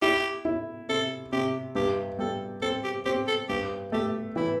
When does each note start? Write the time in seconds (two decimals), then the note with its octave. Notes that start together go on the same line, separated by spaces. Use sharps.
0.02 E4 G4
0.45 E4
0.89 C3 A4
1.32 C3 G4
1.75 G2 G4
2.19 G3 A4
2.62 C4 A4
2.84 G4
3.05 C4 G4
3.27 A4
3.49 G2 G4
3.92 A3 G4
4.36 E3 E4